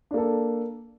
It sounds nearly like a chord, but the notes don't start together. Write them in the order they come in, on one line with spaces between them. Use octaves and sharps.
D4 A#3 A4